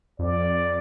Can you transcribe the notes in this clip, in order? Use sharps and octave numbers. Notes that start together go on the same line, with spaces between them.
F2 D5